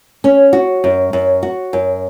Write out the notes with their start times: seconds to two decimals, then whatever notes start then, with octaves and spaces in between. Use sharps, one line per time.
0.24 C#4
0.53 F#4
0.84 F#2
1.13 F#2
1.43 F#4
1.73 F#2